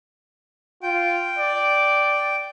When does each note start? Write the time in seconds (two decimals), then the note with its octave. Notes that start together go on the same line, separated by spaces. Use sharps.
0.83 F4 G5
1.39 D5